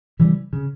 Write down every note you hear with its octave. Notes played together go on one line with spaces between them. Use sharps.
C#3 E3 G3
C#3